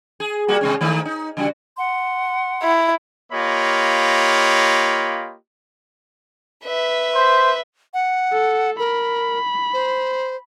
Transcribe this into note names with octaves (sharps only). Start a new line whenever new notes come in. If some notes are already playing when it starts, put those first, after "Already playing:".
G#4
G3 A#3 F#4
C3 G#3 C#4
D#3 A3 D#4
D#4
C#3 G3 F#4
F#5 C6
E4
A#3 F4 G4 C#5 D#5 B5
B4 E5
C5
F#5
A4
A#4 B5
C5